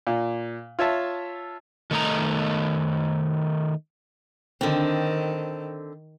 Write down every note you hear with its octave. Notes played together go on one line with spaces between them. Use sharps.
A#2
F4 C#5 E5 A5
D#3 A3 D#4 A#5
D3 D#3 C4